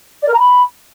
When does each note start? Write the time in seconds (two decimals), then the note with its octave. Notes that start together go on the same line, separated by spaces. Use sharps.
0.22 D5
0.28 A#4
0.33 A#5
0.39 B5